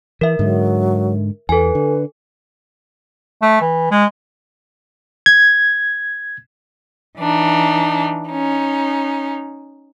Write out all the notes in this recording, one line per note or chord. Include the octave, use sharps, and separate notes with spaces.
E3 A#4 E5
G#2 D3 F#3 G#3
E2 A4 B4 G#5
D3
A3
E3
G#3
G#6
E3 D4 D#4
C#4 D#4